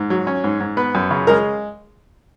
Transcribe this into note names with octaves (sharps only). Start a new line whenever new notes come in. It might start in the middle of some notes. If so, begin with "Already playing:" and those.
Already playing: G#2
F#3
C#4
G#2
G#2
B3 B4
F#2
C#3
G#3 A#4